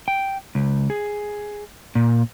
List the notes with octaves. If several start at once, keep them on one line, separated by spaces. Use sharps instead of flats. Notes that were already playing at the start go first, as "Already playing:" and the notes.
G5
C#2
G#4
A#2